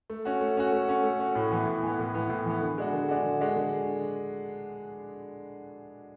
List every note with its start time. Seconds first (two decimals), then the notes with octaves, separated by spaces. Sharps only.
0.10 A3
0.25 C#4 F#4
0.41 A3
0.57 C#4 F#4
0.72 A3
0.89 C#4 F#4
1.03 A3
1.20 C#4 F#4
1.35 A2
1.51 E3 B3
1.67 A2
1.83 E3 B3
1.99 A2
2.15 E3 B3
2.30 A2
2.45 E3 B3
2.61 D3
2.78 G#3 D4 F#4
2.93 D3
3.09 G#3 D4 F#4
3.25 D3
3.41 G#3 D4 F#4
3.56 D3